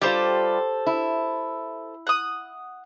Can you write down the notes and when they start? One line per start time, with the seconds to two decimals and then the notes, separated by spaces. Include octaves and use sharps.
0.02 G3 F4 G4 A4 C5
0.86 E4
2.07 F#5 D#6